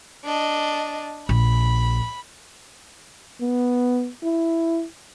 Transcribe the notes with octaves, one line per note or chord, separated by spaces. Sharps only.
D4 D#5
A#1 B5
B3
E4